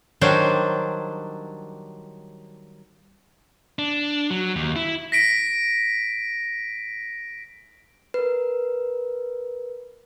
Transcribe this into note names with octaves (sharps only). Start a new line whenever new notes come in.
D#3 F#3 G3 D4 C5
D4
F#3
D#2
E4
A#6 B6 D7
A#4 B4